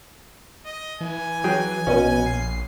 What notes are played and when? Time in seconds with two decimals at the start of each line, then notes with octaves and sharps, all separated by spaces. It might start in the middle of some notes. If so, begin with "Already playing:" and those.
0.65 D#5
1.01 E3 G#5
1.44 F#3 G#4 G5
1.87 A#1 B2 C#4
2.26 C7